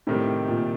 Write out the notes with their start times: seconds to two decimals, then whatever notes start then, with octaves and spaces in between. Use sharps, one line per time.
0.07 A2 C3 D#3 G3
0.48 A#2